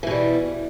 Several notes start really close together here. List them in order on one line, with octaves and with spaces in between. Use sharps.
E3 B2 G3